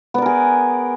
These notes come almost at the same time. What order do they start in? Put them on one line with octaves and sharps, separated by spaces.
B3 D5 A#4 G#4